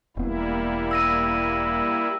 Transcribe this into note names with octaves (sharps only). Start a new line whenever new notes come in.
E1 G3 A#3 B3 E4
E6 A#6 D#7